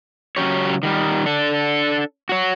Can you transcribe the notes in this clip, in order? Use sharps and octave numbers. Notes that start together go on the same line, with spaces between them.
C#3 F#3 C#4 G4 C#5
D#3 G3
D4 A4
F#4 C#5